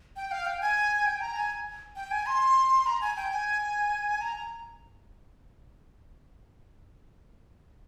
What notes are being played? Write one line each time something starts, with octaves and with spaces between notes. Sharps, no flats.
G5
F5
G5
G#5
G5
A#5
G#5
G5
G#5
C6
A#5
G#5
G5
G#5
A#5